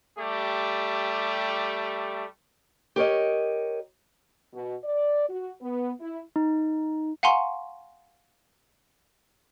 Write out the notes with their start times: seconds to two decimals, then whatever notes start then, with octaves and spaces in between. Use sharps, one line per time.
0.18 G3 A3 G4
2.96 G4 A#4 C#5 D#5
4.53 B2
4.84 D5
5.28 F#4
5.60 B3
6.00 E4
6.36 D#4
7.23 F5 F#5 G#5 A#5 C6 C#6